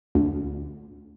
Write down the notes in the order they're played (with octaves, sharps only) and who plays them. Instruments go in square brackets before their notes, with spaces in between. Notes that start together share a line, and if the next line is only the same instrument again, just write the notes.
[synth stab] D2